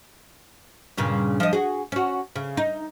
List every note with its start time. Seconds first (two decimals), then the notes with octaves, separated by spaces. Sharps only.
0.97 G2 A#2 C#3
1.40 F3 D#5
1.53 F#4 G#4
1.92 C#4 F#4
2.36 C#3
2.57 D#4